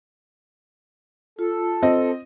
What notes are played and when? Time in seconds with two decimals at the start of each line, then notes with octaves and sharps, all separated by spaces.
1.39 F4 A4
1.83 C4 D#5